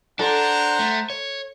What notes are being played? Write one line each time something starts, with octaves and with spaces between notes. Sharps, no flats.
D4 A4 C5 F#5 A#5
A3
C#5